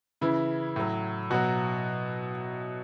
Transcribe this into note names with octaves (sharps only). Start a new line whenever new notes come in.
C#3 E3 E4
A2 F#3
B2 F#3 F#4